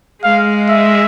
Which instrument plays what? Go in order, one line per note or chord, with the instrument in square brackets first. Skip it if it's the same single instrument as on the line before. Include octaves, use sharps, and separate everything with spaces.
[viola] G#3 [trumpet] F5
[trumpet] E5